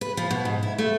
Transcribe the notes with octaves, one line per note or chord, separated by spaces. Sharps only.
B4
F3
B2
G#2
E4
A3